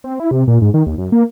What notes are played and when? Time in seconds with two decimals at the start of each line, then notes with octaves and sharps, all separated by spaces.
0.04 C4
0.20 E4
0.31 C3
0.48 A#2
0.62 G#2
0.74 D#3
0.87 D#2
0.98 F#2
1.12 A#3